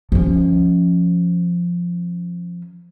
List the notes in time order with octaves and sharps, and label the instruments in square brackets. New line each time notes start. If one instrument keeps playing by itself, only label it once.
[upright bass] F3 C#4